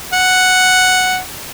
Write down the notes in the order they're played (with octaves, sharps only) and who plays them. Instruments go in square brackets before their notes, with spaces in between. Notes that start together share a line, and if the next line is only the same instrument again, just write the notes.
[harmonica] F#5